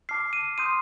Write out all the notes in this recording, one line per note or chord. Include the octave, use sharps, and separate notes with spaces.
A5 D6 F6 C7
D#7
C6 D#6 G6 D#7